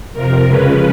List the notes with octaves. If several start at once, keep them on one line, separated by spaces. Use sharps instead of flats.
F2 C3 F3 A#4
C#3 F3 G#3 C#4 B4